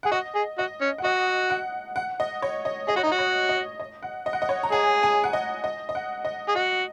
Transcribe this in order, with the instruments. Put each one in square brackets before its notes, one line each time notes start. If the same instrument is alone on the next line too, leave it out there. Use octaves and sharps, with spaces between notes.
[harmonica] G#4 [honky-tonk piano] F#5
[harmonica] F#4 [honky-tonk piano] D#5
[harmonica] G#4
[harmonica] F#4 [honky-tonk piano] D#5
[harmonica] C#4
[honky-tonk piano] F#5
[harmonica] F#4 [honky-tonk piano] D#5
[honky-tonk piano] F#5
F#5
D#5
C#5
D#5
[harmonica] G#4 [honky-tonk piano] D#5
[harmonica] F#4 [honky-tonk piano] C#5
[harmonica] D#4
[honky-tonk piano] D#5
[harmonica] F#4
[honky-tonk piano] C#5
D#5
D#5
F#5
D#5
F#5
D#5
C#5
A#5
[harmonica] G#4 [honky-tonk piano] G#5
[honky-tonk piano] G#5
F#5
D#5
D#5
D#5
F#5
D#5
[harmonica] G#4
[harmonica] F#4 [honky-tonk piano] D#5